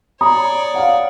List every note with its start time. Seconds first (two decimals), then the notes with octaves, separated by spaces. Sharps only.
0.21 C#5 D5 A#5 D#6
0.74 F5 F#5